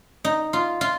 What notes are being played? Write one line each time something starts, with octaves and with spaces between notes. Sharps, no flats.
D#4
F4
F4